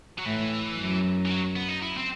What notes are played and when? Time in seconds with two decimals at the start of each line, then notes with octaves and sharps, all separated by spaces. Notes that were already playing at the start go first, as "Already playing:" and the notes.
0.19 F#3
0.25 A2 E3
0.78 F#2
1.26 E3
1.30 F#3
1.56 B3
1.68 D#4
1.82 E4
1.97 C4